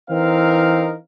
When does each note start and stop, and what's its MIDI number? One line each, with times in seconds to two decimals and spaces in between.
0.10 0.94 52
0.10 0.94 60
0.10 0.94 63
0.10 0.94 70
0.10 0.94 77